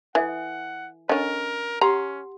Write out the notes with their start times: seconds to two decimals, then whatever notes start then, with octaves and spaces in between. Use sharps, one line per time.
0.15 E3 A4 E5 F#5 G#5
1.09 D3 C#4 A#4 D#5
1.81 C#4 G4 F#5 A#5 C6